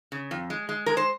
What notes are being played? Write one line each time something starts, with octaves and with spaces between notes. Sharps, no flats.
C#3
F2
G#3
G#3
G#3 A#4
C5